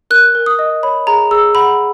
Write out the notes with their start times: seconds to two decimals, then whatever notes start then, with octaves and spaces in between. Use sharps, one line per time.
0.11 A#4 F#6
0.35 A#4
0.46 D#6
0.59 D#5
0.83 C#5 B5
1.07 G#4 A#5
1.31 G#4 E6
1.55 F#5 B5